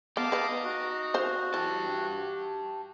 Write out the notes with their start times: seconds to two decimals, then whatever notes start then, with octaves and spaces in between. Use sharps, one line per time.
0.17 B3 D#4 F5 A5 D6
0.32 B4 F#5
0.64 F#4
1.14 C5 F5
1.54 E3 G4 A5